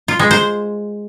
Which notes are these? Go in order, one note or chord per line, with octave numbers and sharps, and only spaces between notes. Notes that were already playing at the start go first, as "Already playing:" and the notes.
F4
G#3
C5